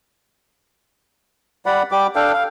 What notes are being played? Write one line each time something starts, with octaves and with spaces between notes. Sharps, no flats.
G3 D5 F#5 B5
G3 G4 D6
D4 A4 F5 G5
F5